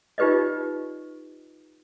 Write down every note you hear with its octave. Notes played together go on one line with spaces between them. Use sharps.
D#4 F4 G4 B4 D5 D#5